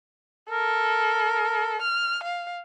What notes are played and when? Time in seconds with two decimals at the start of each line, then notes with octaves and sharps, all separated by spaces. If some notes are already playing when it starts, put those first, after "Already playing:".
0.51 A4 A#4
1.82 F6
2.24 F5